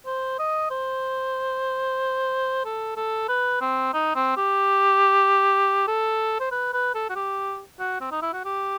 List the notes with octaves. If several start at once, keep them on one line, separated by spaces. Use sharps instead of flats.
C5
D#5
C5
A4
A4
B4
C4
D#4
C4
G4
A4
C5
B4
B4
A4
F#4
G4
F#4
C4
D#4
E4
F#4
G4